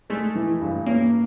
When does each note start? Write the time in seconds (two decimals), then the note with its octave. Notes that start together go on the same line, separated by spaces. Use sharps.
0.10 G#3 A3
0.35 E3
0.61 G2
0.86 A#3 C#4